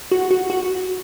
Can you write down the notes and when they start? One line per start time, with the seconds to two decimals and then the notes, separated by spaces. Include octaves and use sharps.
0.11 F#4
0.31 F#4
0.50 F#4